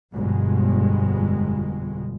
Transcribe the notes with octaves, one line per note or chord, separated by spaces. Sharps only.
G1 F2 B2 G#3